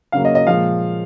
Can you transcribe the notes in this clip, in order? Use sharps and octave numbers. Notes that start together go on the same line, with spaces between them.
C#3 F#3 A#3 F5
D#5
D#5
A#2 F3 G#3 F5